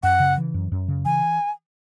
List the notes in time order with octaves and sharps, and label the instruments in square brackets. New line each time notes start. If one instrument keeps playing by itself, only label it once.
[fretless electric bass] F#2 [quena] F#5
[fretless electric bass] C#3
E3
F#2
F#2
C#3
[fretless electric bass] E3 [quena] G#5